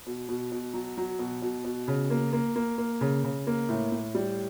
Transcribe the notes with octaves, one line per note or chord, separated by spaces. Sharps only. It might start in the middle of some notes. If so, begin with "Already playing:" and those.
B2
B2
B2
F#3
F#3
B2
B2
B2
C#3
A#3
A#3
A#3
A#3
C#3
C#3
A#3
A2
A2
G3